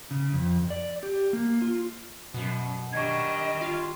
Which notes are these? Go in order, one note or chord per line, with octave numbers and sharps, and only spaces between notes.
C#3
F2
D5
G4
A#3
F4
F#2 B2
D#3 G3 D4 D#5 C#6 G#6
F4